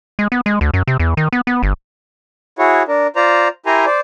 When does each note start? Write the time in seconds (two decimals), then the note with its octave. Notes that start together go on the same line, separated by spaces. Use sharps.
0.19 G#3
0.32 B3
0.46 G#3
0.61 D2
0.74 F#2
0.88 C3
1.00 E2
1.17 D#3
1.33 B3
1.47 B3
1.63 G1
2.59 E4 F#4 G#4 C#5
2.88 D4 A#4
3.16 F4 C5 D5 A#5
3.66 E4 G4 A#4 G#5 A#5 C6
3.86 C5 D5